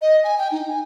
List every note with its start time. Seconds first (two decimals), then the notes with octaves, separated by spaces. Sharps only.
0.02 D#5
0.24 G#5
0.39 G5
0.52 D#4
0.68 G#5